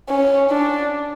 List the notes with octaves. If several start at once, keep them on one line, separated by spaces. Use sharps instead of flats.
C#4
D4